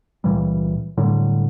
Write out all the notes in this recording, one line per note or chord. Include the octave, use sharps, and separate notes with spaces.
C#2 A#2 E3 G3
A2 D3 F#3 G3